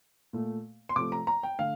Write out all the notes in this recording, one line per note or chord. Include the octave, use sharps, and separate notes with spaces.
A#2 A3
C6
C3 F3 A3 D6
A#5
A#5
G5
D3 A3 F5